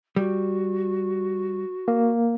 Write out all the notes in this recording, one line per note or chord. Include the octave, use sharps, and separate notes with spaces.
G3 F#4
A#3